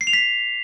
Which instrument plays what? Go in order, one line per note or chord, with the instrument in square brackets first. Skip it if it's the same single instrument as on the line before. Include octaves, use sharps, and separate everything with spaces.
[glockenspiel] C7
F7
B6